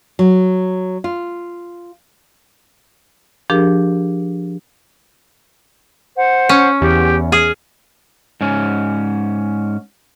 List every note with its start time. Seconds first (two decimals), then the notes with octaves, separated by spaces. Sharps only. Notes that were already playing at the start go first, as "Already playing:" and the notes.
0.19 F#3
1.04 F4
3.50 F3 D4 G4 G#4 A#4
6.16 C5 F#5
6.49 C#4
6.81 E2 G4
7.32 G#4 F6
8.41 G#2 C#4